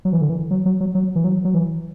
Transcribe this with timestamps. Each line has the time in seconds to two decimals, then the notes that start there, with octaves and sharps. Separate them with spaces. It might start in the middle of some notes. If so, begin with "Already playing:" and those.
0.05 F#3
0.13 E3
0.21 D3
0.29 E3
0.51 F#3
0.66 F#3
0.80 F#3
0.95 F#3
1.15 E3
1.24 F#3
1.45 F#3
1.54 E3